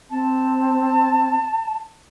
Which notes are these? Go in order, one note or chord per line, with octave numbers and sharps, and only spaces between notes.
C4 A5